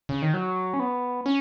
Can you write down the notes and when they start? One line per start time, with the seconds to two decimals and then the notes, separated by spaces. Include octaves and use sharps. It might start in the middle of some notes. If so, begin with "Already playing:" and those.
0.09 C#3
0.22 D#3
0.34 F#3
0.74 C#4
0.80 B3
1.26 C#4